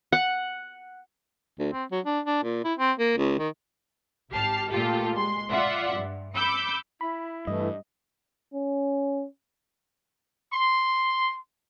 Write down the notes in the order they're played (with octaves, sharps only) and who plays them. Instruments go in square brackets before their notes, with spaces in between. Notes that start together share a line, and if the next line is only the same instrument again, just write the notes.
[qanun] F#5
[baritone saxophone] D2
C4
F#3
D4
D4
A#2
E4
C4
A#3
C#2
D#3
[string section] G#1 G4 A5 F6 C7
A#2 A3 F4 G4 A4
G#3 C6
F4 D5 E5 F#5 C6
G2
B5 D6 E6 G6 C#7
[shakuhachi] E4 [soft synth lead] B5
[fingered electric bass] G2 [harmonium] E3 A3 [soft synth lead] D#5
[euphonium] C#4
[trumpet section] C6